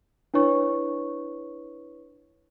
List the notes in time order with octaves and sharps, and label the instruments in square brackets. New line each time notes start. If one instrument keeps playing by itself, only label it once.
[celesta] D4 E4 B4 C#5 C#6